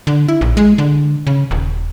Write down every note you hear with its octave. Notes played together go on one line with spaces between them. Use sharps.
D3
E4
A#1
G#3
D3
C#3
D#1